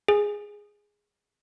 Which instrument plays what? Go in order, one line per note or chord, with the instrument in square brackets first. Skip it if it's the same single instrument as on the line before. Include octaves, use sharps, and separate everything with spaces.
[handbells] G#4